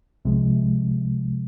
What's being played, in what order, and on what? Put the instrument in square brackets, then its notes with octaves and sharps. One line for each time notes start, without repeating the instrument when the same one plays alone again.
[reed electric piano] C2 C3 F3 G#3